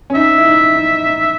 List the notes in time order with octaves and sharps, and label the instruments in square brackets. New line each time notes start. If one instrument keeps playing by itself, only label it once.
[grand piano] C#4
[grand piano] D#4 [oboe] E5
[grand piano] E4
D#4
D#4
D#4